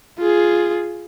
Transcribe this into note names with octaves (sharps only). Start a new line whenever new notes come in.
F4 G#4